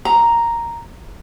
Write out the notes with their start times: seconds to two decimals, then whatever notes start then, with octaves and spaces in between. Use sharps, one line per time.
0.05 A#5